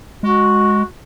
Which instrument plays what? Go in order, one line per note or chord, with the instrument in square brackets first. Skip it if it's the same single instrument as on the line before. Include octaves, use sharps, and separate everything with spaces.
[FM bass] G#3 [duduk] F#4